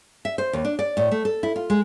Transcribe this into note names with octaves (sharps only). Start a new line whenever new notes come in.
E5
C5
D#2
D4
D5
A2
A3
A4
E4
F4
G#3